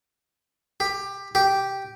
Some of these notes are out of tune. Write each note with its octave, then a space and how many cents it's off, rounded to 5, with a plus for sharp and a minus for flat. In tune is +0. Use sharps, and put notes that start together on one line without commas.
G4 +15
G4 -5